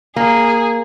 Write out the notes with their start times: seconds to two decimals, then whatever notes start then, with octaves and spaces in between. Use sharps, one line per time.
0.16 A#3 G#4